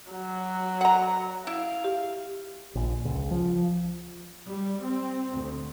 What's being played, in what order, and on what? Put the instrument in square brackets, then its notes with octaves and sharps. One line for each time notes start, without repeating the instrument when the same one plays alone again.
[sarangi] F#3
[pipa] F#5 A#5
[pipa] E4 [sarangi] F5
[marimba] G4
[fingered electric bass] A#1
C#2
F3
[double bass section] G3
C4
D2